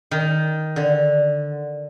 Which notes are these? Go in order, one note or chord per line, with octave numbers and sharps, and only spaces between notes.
D#3
D3